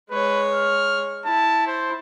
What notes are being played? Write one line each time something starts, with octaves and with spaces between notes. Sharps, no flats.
G#3 B4 C#5
F6
E4 A5
C5